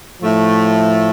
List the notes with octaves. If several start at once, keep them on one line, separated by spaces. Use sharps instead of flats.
A2 F3 A3